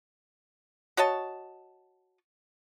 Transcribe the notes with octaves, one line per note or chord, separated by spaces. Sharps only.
F#4 C#5 D#5 A5